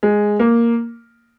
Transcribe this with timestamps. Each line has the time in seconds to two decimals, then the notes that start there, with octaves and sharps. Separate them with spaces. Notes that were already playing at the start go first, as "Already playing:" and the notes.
0.03 G#3
0.39 A#3